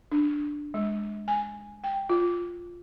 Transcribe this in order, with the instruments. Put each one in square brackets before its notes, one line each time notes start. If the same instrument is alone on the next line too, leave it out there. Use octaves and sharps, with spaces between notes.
[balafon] D4
G#3
G#5
G5
F4